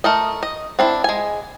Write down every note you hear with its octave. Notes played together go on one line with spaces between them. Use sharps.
A3 A#4 D#5
D#5
C4 D4 E4
G#3 G#5